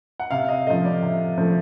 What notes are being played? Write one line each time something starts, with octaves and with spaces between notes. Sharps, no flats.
F#5
C3 F5
D#5
F3 A3 D#5
D5
C3
F3 A3